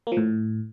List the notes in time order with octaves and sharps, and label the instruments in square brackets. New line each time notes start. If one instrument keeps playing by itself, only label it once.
[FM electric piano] A#3
F3
A2